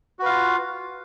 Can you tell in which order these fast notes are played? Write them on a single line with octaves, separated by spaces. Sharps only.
F#4 B4 F5 F4